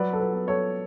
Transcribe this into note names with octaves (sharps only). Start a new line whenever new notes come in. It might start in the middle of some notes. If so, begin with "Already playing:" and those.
Already playing: F#3 B4 D5
A4
B4
B3
A4 C#5